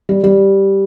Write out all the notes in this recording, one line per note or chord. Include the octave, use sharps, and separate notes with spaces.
G3
G3